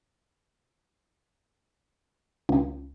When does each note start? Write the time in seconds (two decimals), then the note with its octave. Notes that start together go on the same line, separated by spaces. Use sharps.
2.49 C#2